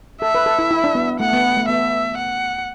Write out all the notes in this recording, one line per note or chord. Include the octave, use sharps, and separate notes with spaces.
A4 E5
B4
A4
E4
E4
D4
B3
A3 F#5
B3
A3
B3 E5
F#5